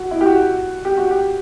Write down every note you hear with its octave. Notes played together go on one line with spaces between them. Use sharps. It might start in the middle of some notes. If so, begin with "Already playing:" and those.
Already playing: F#4
E4
G4
F#4
G4
F#4
G4